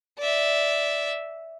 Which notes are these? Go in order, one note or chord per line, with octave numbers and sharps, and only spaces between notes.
D5 E5